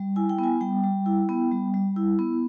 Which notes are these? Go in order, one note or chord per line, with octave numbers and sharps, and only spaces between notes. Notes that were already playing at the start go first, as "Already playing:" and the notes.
Already playing: G3
E4 G#5
G5
B3
G#5
G3 G5
G3
E4
B3
G3
G3
E4
B3